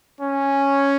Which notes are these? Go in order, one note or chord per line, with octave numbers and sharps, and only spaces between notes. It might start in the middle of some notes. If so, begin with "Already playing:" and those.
C#4